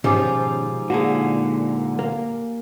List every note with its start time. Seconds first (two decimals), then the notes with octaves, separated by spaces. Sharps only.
0.04 G#2 B2 D#3 F3 C#4 G4 G#5 D6
0.90 A#2 D3 F#4 G#4
1.99 A#3